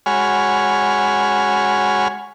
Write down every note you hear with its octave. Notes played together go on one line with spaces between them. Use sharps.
G#3 F#4 C#5 G#5 B5 F6